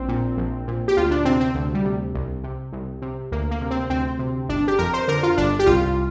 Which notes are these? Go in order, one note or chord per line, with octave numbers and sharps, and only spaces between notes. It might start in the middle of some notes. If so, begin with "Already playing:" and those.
Already playing: A#1 C4
A#2
A#1
A#2
G4
D2 F4
D4
C3 C4
C4
D2
G3
C3
C2
C3
C2
C3
D2 A#3
A#3
C3
C4
D2 C4
C3
G1 D4
G4
F2 A#4
C5
D3 A#4
F4
G1 D4
G4
C2 F4